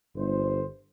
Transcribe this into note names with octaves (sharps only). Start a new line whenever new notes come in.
G1 C5